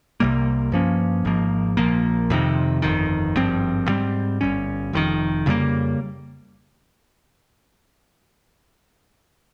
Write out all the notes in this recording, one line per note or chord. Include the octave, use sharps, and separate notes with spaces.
C2 C3 G3 A#3
G2 F3 A#3 C#4
G#1 G#2 F3 A#3
A#1 A#2 F3 A#3
F2 C3 D#3
G1 F2 D#3
G#1 G2 F3 C4
G#2 G3 C4
G1 G2 G3 C#4
F1 F2 C3 D#3
F2 C#3 G3 A#3